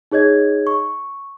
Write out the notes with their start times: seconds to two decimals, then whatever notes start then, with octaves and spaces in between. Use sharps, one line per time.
0.12 D#4 G#4 C#5 D#5 G#6
0.67 C#6